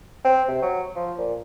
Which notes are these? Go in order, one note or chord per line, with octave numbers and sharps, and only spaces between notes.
C4
C3
F#3
F3
A#2